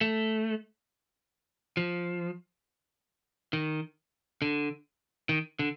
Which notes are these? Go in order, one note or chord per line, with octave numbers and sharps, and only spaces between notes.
A3
F3
D#3
D3
D#3
D3